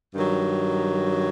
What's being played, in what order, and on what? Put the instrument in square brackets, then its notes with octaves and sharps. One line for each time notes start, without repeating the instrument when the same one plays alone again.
[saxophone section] G2 D#3 F#3